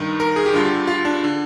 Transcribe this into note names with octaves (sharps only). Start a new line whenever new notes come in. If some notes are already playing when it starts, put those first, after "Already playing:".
Already playing: G2 D#3 D#4
A#4
G#4
G4
G2 D3 F4
G4
F4
D4
D3